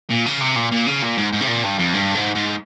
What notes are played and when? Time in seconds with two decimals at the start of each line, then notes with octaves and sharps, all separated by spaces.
0.10 A#2
0.26 C#3
0.41 C3
0.56 A#2
0.72 A#2
0.86 C#3
1.02 A#2
1.17 G#2
1.33 G#2
1.41 C3
1.47 A#2
1.64 G2
1.79 F2
1.94 G2
2.14 G#2
2.35 G#2